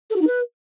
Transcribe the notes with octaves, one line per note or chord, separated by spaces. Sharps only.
A4
F#4
D#4
B4